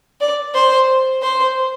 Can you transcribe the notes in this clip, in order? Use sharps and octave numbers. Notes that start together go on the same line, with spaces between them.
D5
C5
C5